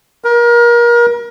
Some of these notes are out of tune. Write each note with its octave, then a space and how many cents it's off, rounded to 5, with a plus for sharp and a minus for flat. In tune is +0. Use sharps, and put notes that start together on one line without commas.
A#4 +30